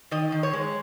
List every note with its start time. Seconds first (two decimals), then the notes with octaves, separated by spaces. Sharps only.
0.11 D#3 D#5
0.32 D#3
0.43 C#5
0.53 G#3